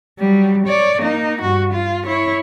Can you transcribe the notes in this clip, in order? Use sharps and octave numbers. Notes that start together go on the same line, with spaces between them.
F#3 G3
C#5 D5
A#3 D#4
G2 F#4
F4
E4 C#5